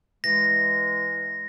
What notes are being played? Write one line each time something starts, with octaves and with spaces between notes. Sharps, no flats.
E3 G#3 A#6